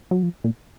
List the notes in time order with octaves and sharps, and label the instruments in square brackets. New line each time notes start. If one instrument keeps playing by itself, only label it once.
[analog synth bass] F#3
F3
A#2